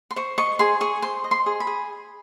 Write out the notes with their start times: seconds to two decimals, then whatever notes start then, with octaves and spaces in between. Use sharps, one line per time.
0.11 C6
0.16 C5 C#6
0.38 D#5 C#6
0.59 G#4 C6
0.81 G#4 C#6
1.02 C5 C6
1.24 D#5
1.31 C6
1.46 G#4
1.60 B5
1.67 G#4